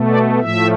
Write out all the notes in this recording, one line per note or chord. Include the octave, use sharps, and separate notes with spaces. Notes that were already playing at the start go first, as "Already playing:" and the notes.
Already playing: B2 A3
D5
A2 F3 A3 E5